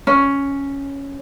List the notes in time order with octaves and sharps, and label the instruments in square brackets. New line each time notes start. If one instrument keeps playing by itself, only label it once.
[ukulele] C#4